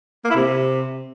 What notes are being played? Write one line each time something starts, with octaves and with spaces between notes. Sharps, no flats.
A#3
E4
C3